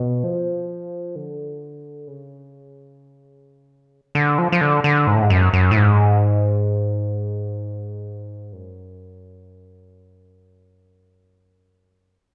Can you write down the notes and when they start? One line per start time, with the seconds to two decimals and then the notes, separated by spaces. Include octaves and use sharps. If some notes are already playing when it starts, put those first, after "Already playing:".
Already playing: B2
0.24 F3
1.16 D3
2.07 C#3
4.15 D3
4.38 F3
4.52 F3
4.61 D3
4.84 D3
5.07 G#2
5.15 A2
5.22 G#2
5.30 F#2
5.53 F#2
5.71 A2
5.77 G#2
8.53 F#2